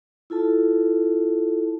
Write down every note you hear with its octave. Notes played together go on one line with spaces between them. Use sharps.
E4 F4 A4 A5